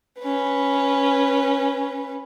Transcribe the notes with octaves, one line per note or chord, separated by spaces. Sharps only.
C#4 B4